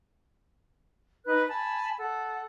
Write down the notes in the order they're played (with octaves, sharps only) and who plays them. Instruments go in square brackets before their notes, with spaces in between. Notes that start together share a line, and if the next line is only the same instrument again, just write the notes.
[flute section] D#4 B4 F#6
G#5 A5 B5
A4 F#5